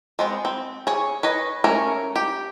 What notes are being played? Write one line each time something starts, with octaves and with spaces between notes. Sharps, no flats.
G#3 B3 C4
C4
G#4 C#5
B4 C#5 D#5
A3 C#4 A#4 C#5
G4